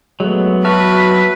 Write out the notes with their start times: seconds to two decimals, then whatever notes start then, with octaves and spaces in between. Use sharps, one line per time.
0.20 F#3 G#3 A3 B3
0.64 F#4 B4 E5 A5 F6